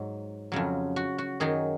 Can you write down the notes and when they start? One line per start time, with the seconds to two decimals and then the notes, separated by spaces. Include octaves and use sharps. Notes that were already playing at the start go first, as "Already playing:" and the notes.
Already playing: G#2 F#3
0.52 F2 C#3 F#3
0.96 F#4
1.18 F#4
1.40 F#2 D#3 F#3 G#4